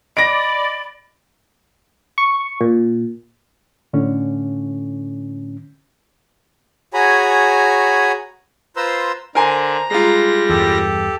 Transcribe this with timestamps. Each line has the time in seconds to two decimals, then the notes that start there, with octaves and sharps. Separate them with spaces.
0.17 D5 D#5 B5 A#6 D7
2.18 C#6
2.61 A#2
3.93 A2 D3 C#4
6.94 F#4 G#4 C#5 G#5 A#5 B5
8.77 F4 B4 C5 A#5 C6 E6
9.35 D3 A#4 C5 G#5 A#5
9.90 G3 G#3 F4 A#6
10.49 E2 G2 G4 A4